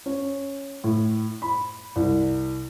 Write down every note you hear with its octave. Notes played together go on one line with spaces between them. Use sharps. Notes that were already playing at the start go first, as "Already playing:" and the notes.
C#4
A2
B5
C2